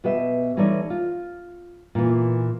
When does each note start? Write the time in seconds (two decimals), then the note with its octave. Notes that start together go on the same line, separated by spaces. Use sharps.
0.04 B2 G4 B4 D#5 E5
0.57 E3 G3 A3 D#4 C#5 D5
0.90 F4
1.95 A#2 E3